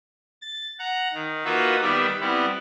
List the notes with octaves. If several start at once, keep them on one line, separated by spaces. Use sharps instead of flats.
A6
F#5 A#5
D#3
A#3 D#4 F4 F#4 B4 E5
D#3 G3 B3 D5 E5
G3 B3 C4 E4